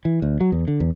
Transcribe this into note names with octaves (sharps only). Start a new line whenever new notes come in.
E3
D2
F#3
E2
D3
E2